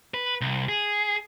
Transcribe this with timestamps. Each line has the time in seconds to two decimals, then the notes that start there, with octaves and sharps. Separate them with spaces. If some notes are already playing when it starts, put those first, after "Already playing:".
0.14 B4
0.41 C2
0.69 G#4